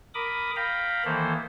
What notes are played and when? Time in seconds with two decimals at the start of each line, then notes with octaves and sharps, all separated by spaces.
0.14 A#4 B5 D6 D#6
0.56 F5 G5 A#5 B5
1.05 D#3 E3 A#3 A4 C5